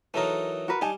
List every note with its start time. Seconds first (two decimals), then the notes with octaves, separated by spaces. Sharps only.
0.14 E3 F#3 D#4 A4 A#4
0.68 F#4 A#4 B4
0.82 G3 D#4 G#5 A5